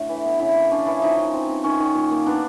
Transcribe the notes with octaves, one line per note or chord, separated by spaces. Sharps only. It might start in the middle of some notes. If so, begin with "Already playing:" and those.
Already playing: A2 D3 A3
E3
B3
C#3 E4
A#3
C#4 D4
E3 E4
F3 D#4
C#4
C4
C4
D#3 C#4
D#3
A#2
A#3
B3 D4